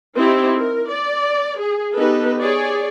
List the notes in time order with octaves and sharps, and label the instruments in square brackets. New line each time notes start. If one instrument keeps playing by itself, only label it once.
[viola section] C4 D#4 E4 G4
A#4
D5
G#4
B3 D#4 G4 A4 B4
G#4 C#5 D5